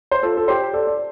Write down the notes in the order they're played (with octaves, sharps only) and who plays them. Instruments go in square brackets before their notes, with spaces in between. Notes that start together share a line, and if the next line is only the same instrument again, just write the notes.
[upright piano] C5
F4 A4
A4
G4 C5
A4 D5
D5